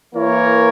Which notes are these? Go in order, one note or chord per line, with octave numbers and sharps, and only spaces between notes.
E3 A#3 E4 A#4 C#5